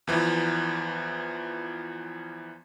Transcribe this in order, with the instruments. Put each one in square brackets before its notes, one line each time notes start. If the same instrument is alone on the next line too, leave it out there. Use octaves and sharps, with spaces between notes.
[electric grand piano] E2 E3 F3